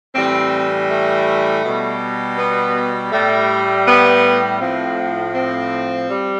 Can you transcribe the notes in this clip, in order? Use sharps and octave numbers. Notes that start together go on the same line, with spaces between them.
A2 E3 G3 C4
A3
B2 G3
B3
A2 G3 A3
B3
A2 F3 C4
C4
G3